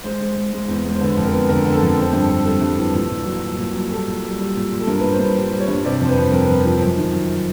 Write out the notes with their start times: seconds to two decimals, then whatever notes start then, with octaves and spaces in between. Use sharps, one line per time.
0.04 G#3 C5
0.20 G#3
0.35 G#3
0.52 G#3
0.68 E2
0.84 G#3
0.93 C5
1.00 D3 B4
1.16 F2
1.25 A#4
1.32 B3
1.49 D3 A#4
1.65 D3
1.73 A4
1.81 F2
1.97 C4
2.13 G2
2.29 C4
2.45 G3 A4
2.61 G2
2.77 E3
2.94 A#2
3.10 A#2
3.26 F#3
3.43 A#2
3.58 A#2
3.74 F#3
3.90 G3 A4
4.07 A#2
4.23 G3
4.39 G3
4.56 A#2
4.71 A#2
4.81 A4
4.87 G2 A#4
4.99 G2 B4
5.11 C5
5.19 G2 B4
5.35 G3 C5
5.51 G3
5.60 C#5
5.68 G2
5.85 C3 D5
6.00 F2 C5
6.09 B4
6.17 F2
6.32 F2 A#4
6.47 F2 B4
6.57 C5
6.65 F3
6.81 F#2
6.96 D#3
7.13 F#2